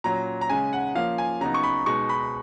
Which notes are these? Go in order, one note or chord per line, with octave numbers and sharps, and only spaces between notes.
A#2 F#3 C#4 A#5
A#5
C#3 G#3 C#4 G#5
F#5
F3 A#3 C#4 F5
G#5
C#3 F#3 B3 D#4 A#5
C#6
B5
B2 G#3 D#4 C#6
B5